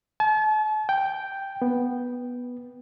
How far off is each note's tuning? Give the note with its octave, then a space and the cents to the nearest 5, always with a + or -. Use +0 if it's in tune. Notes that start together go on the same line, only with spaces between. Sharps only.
A5 -40
G5 +0
B3 -5